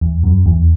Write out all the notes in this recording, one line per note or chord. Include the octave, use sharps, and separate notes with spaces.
E2
F#2
E2